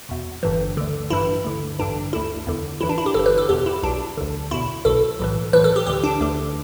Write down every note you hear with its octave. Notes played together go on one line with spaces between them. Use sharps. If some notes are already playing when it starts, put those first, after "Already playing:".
E2 B2
G1 G2 E3
D2 D3
A1 G2 E3 E4
D2 D3
A1 G2 D3 D4
D2 D3 E4
E2 D3
A1 G2 E3 E4
D4
E4
G4
G1 G2 E3 A4
B4
A4
E2 B2 G4
E4
B1 B2 D4
D2 D3
E2 B2 E4
B1 B2 A4
B1 A2 E3
B1 A2 E3 B4
A4
G4
D2 D3 G4
D4
D2 D3